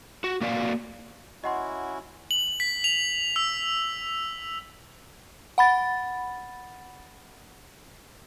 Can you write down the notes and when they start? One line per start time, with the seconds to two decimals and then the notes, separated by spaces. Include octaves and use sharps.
0.24 F#4
0.41 A#3 F#4 D5 F5
1.44 C#4 E4 F#4 D#5 F#5 C6
2.31 F#7
2.60 B6
2.84 F7
3.36 E6
5.58 F#5 B5 A6